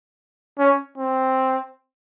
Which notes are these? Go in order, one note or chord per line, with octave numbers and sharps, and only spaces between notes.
C#4
C4